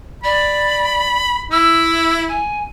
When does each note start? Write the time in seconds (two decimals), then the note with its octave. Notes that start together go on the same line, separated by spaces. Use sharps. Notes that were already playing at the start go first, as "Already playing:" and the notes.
0.24 D5 B5
1.51 E4 E6
2.28 G#5